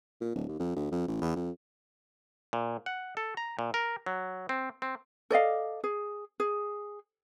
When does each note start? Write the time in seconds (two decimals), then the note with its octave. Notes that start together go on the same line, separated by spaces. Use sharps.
0.21 A#2
0.35 D1
0.48 D#2
0.60 F2
0.76 D2
0.91 F2
1.08 A1
1.21 E2
1.36 F2
2.53 A#2
2.86 F#5
3.17 A4
3.37 A#5
3.59 A#2
3.74 A#4
4.06 F#3
4.49 C4
4.82 C4
5.31 A4 D5 D#5 F5
5.84 G#4
6.40 G#4